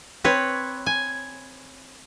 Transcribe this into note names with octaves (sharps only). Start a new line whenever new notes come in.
C4 B4 C#5
G#5